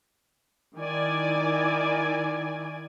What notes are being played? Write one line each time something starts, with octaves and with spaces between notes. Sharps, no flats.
D#3 E4 D5 G#5